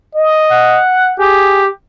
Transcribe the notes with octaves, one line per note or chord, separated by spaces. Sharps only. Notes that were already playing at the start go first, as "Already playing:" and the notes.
D#5
F#5
G4 G#4